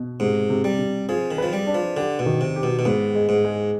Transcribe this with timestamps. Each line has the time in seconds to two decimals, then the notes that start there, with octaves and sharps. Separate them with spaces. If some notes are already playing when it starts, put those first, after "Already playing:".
Already playing: B2
0.20 G#2 C3
0.49 C3
0.64 G3
0.79 C3
1.09 F3 G#4
1.31 D#3
1.38 F3 B4
1.53 G3
1.67 D4
1.74 F3
1.96 D3 G4
2.19 B2
2.26 D#3
2.41 C3
2.56 G4
2.63 B2
2.79 B2
2.85 G#2 B3
3.15 G#3
3.29 G#2
3.45 G#3